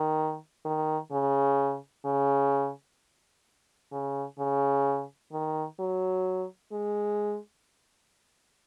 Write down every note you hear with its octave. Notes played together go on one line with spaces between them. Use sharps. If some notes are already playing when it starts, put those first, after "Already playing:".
Already playing: D#3
D#3
C#3
C#3
C#3
C#3
D#3
F#3
G#3